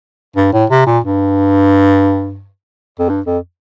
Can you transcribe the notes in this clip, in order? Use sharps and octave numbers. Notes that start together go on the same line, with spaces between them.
G2
A2
C3
A#2
G2
F2
G2
F2